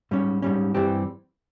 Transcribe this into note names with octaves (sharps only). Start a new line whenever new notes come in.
G#2 G3 C#4
G#2 G3 C#4
G2 E3 G3 C4 G4